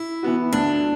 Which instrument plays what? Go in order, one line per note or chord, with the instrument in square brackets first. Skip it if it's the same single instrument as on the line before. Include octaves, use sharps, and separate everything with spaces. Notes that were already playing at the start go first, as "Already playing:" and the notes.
Already playing: [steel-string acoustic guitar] E4
[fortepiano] E3 B3 F#4
[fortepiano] D2 [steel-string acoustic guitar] D4